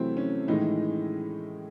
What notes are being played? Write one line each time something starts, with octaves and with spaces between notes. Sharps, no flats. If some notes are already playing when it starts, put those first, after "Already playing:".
Already playing: C3 E3 F#3 A3 C4 E4
C#4
A2 D#3 E3 G#3 D#4